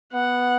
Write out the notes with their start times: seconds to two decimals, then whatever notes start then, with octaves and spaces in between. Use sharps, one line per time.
0.13 B3 F#5